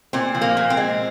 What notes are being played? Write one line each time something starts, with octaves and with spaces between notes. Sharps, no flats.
A#2 C4
F3
A#3
A#2
C4
G#3